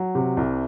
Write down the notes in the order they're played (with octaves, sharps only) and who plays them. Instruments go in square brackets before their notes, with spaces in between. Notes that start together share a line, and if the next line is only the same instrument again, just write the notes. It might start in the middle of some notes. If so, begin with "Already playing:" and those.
Already playing: [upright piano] F#3
C3
C2